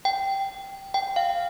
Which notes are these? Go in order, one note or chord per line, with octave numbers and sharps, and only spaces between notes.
G5
G5
F5